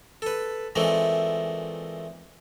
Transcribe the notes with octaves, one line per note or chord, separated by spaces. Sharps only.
A4 B4
A#2 E3 G#3 A3 C4